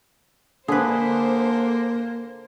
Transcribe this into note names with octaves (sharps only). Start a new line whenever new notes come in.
D3 A#3 G#4 A4 B4 C5